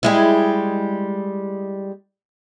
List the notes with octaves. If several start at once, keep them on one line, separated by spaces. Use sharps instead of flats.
G3 G#3 E4